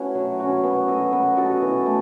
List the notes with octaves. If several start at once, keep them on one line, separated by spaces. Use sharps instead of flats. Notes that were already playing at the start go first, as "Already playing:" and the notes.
Already playing: A3 C#4 E4 F#4 B4
F#3
C#4 F#4
B3
F#4 A4 D#5
B3
F#4 A4 D#5
E3
A3